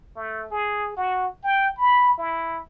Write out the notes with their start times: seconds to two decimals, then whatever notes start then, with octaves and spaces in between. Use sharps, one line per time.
0.16 A3
0.51 G#4
0.97 F#4
1.44 G5
1.78 B5
2.18 E4